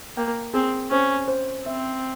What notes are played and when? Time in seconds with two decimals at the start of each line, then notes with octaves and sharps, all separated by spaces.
0.17 A#3 G5
0.54 C4 G#4
0.91 C#4 C5
1.28 C5
1.66 C4 E5